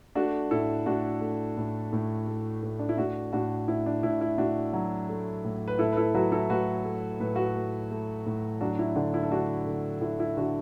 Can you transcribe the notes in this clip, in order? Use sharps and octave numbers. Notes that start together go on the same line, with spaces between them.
A3 D4 F#4
A2 E4 A4
A2 D4 F#4
A3
A2
A2
A3
A2
D4
E4
A2 D4 F#4
A2 D4 F#4
A2 E4
D4
A2 E4
E4
A2 D4 F#4
F#3
A3
A2
B4
A2 E4 A4
B4
E4 A4
F#3 F#4 B4
E4 A4
A2 F#4 B4
A3
A2 B4
F#4 B4
A3
A3
A2
F#3 D4 F#4
E4
D3 D4
E4
A4
A3 D4 F#4
D3
D3 E4
E4
D3 D4 F#4